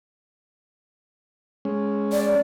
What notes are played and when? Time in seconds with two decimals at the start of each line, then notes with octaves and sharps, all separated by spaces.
1.65 G#3 C#4
2.13 D5